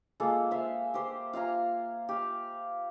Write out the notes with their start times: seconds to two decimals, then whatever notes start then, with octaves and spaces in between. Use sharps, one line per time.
0.20 G#3 A#3 F4 A4
0.51 C5 E5 F5
0.94 G4 C5
1.33 F4 F5 G#5 A#5
2.09 G4 F5